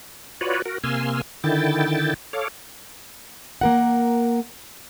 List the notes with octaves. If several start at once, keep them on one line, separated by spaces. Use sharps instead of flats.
F4 F#4 B4 C#5 D5
F#4 A#4
C3 A#3 G#5 C6 E6 F6
D3 D#3 E4 G5 A6
A4 C#5 F5 D6
A#3 A#4 F#5